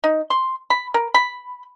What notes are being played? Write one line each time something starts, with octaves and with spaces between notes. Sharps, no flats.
D#4
C6
B5
A#4
B5